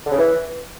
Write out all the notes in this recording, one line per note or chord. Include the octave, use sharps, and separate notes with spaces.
D3
C#3
E3